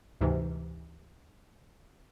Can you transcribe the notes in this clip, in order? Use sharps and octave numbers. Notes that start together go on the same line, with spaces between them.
D2 G#2 C3 E3